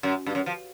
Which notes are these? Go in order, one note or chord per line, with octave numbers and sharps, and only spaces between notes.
F#2
G2
F#2
F3